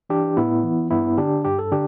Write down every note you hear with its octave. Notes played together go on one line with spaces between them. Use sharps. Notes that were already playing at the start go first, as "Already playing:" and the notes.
E3 D4 G4
A2 B3 E4
E3
G2 B3 E4
D3 D4 G4
G2 G4
A4
D3 D4 G4